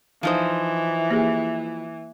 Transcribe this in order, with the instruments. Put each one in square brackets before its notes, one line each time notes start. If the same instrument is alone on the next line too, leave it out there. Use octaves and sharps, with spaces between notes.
[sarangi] E3 [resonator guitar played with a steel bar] F3 D#4 C5
[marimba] A#3 G4 G#4